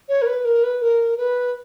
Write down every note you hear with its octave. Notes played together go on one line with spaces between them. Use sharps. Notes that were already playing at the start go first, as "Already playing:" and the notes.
C#5
A#4
B4
A#4
B4
A#4
B4